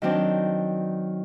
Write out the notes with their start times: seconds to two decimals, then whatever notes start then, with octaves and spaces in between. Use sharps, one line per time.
0.02 D#3 F#3 C4 D4